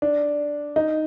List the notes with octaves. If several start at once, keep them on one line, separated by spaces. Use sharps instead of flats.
D4
D#4